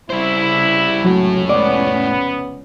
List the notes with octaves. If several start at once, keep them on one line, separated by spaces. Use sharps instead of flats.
C#3 G3 E4 C5
F1 C#2 A2 F#3 A3 C#4
B3 D5